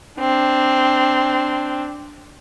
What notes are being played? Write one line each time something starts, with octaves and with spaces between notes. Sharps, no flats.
C4 D4